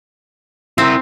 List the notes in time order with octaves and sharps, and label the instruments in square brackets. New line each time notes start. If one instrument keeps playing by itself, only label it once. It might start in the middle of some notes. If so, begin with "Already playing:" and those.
[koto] C4 [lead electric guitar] E4 A#4